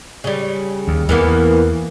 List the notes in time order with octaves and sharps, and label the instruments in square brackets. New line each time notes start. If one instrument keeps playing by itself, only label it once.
[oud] C#3 G3
[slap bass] D#2
[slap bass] E2 [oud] E3 A#3 B3